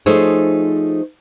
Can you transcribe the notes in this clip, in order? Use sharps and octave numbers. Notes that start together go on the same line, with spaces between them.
F3 A3 D#4 G#4 C5 C#5